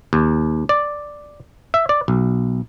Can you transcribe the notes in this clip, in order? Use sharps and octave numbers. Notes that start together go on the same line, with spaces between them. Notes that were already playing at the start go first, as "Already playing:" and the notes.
D#2
D5
E5
D5
B1